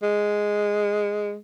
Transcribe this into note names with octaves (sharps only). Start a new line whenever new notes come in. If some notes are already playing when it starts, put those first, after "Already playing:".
G#3